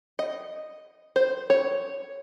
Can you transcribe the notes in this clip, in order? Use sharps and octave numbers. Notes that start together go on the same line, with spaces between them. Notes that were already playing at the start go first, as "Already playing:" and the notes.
D#5
C5
C#5